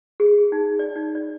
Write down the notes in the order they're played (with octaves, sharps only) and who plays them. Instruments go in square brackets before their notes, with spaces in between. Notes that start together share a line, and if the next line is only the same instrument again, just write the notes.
[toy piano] G#4
D#4
D5
D#4
D5